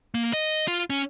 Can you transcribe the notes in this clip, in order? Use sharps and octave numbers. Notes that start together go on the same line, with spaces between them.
A#3
D#5
F4
C#4